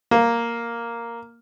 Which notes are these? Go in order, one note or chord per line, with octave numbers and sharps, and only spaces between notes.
A#3